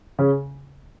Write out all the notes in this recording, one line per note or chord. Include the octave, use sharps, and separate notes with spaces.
C#3 C#4